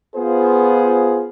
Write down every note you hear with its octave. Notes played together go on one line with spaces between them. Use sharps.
B3 F4 G#4 C5